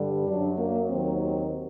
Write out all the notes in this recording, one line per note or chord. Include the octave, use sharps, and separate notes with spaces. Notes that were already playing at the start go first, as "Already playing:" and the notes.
Already playing: G2 D3 G3
F#2 F#3 D4
A#3
D#2 D#3 F#3 C4
C4